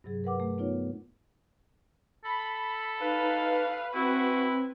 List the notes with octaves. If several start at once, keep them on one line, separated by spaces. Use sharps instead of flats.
G2 C3 F#3 G#4
A#4 B4 F#5 D6
A3
B3 D#4 F4 C#5
A4 B5
D#4 B4 F5
C4 E4 F#4